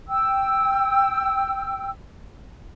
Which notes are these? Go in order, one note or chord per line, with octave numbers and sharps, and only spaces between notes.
G5 E6